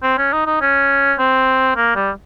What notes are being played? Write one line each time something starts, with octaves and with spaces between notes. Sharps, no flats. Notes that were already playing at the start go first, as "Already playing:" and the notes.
C4
C#4
D#4
D#4
C#4
C4
A#3
G3